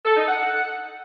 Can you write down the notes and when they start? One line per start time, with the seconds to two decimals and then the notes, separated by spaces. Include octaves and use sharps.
0.05 A4
0.17 D#4
0.28 F#5